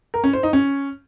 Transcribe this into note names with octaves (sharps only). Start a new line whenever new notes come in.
A#4
C#4
C5
D#4
C#4